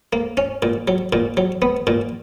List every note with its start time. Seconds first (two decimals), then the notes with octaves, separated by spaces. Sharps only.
0.13 A#3
0.37 C#4
0.62 A#2
0.88 F#3
1.13 A#2
1.37 F#3
1.62 B3
1.87 A#2